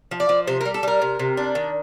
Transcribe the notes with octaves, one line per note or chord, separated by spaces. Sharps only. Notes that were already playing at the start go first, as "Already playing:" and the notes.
F3
D5
F3
C3 C5
A#4
G3
A4
G3 A#4
C3
C3
D4
D#3